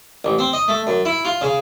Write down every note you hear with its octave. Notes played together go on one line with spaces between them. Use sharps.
A1
C4
D#5
A3
F#2
E4
F4
C#3